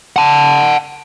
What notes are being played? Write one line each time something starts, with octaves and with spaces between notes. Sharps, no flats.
F#5 A5